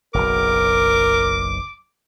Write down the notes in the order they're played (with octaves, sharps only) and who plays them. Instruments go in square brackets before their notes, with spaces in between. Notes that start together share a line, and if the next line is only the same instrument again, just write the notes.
[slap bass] F#1 B1 [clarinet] A#4 [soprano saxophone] D6